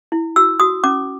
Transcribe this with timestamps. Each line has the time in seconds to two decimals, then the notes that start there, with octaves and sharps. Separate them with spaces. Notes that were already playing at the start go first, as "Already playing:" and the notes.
0.12 E4
0.36 F#4 E6
0.60 F#4 D#6
0.84 C#4 D6